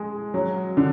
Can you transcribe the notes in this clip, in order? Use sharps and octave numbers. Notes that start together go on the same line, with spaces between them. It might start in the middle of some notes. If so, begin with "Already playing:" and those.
Already playing: G#3
F#3
D3